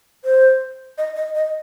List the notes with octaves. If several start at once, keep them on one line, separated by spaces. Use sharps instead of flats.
C5
D#5
D#5
D#5